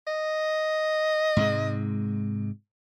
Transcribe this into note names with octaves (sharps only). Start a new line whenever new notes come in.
D#5
G#2 C3 G#3